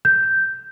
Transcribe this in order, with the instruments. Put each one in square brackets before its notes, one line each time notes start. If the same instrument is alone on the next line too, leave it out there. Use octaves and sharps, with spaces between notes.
[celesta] G6